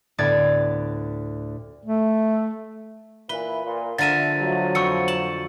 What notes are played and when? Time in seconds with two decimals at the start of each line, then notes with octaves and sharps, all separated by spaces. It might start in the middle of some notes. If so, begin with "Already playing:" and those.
0.18 D2 A2 B3 D5 G#6 A6
1.85 A3
3.29 A#2 E3 B4 G7
3.64 A#2
3.98 D3 F3 A3 A#4 E5 A6 D#7
4.40 F#3
4.75 F2 C#6 E6 C#7
5.08 A5 F#7